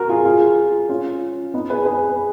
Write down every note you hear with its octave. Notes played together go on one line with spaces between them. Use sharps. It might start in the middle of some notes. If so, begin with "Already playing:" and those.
Already playing: F#4 A#4
F4 G#4
F4 G#4
C#4 F4
B3 D#4
G#4 B4
G#4 B4